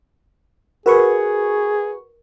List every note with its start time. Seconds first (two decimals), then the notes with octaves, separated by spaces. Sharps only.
0.86 F#4 G#4 A#4 B4 C#6